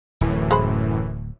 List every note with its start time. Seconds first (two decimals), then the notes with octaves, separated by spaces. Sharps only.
0.21 D1 F#2 A2 E3
0.51 G#3 C5 B5